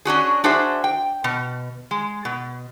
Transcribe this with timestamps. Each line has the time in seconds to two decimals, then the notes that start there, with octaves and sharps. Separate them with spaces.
0.05 C#4 D4 F#4 G#4
0.44 D4 F#4 G#4 C5 E5
0.84 G5
1.24 B2
1.91 G#3
2.25 B2